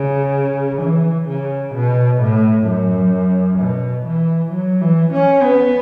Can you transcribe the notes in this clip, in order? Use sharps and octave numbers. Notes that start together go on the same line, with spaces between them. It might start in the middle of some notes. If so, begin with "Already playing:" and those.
Already playing: C#3
E3
C#3
B2
A2
F#2
B2
E3
F#3
E3
C#4
B3